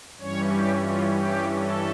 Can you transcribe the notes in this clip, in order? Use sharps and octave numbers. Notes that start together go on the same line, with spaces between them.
G2 E3 G3 C#4 C#5
G4
F4
G4
A4